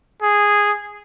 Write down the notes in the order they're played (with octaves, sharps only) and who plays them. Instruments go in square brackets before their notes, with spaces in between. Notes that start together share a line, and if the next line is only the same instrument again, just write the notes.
[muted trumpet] G#4